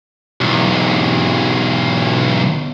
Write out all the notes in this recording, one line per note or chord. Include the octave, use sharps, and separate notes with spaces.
B1 E2